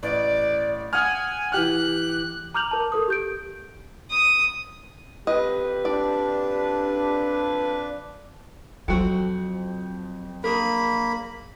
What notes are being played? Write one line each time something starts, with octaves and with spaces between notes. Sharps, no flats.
A1 D5
F#5 G#5 D#6 F6
E3 G4 F6 F#6
A#5 D6 F6 G6 F7 F#7
A#4 A5
A4 A#4 D#6
G4 G6 D7
D#6
F2 F3 G4 B4 D#5
D4 D5
F2 F#3 C4 F#4 A4 G5 C#7
A#3 D4 G#4 A#4 B5